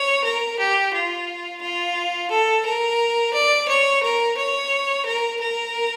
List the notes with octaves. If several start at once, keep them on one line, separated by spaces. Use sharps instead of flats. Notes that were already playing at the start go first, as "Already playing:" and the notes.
Already playing: C#5
A#4
G4
F4
F4
A4
A#4
D5
C#5
A#4
C#5
A#4
A#4